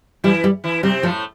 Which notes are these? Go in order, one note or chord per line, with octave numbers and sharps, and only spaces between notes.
E3 G3 E4
G3
E3 E4
C3 G3 C4
A2 F3 A3